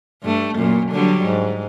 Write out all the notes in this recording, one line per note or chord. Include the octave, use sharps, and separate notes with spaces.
G2 A3
F#2 A#2
D3 F#3 G3
G#2